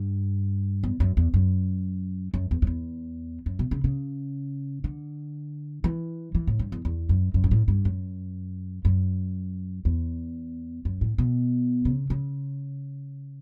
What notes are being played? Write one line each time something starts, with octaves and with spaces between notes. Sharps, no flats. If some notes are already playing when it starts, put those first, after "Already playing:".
Already playing: G2
E2
F#2
E2
F#2
F#2
E2
F#2
E2
F#2
B2
C#3
C#3
D3
E3
E3
A2
G2
E2
E2
F#2
F#2
G2
A2
G2
F#2
F#2
E2
F#2
A2
B2
C#3
C#3